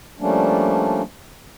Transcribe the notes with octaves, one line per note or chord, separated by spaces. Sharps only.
F3 G3 A3 A#3 C#4 D4